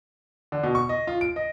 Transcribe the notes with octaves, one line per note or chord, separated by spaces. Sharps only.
D3
B2
C#6
D#5
F4
D7
D#5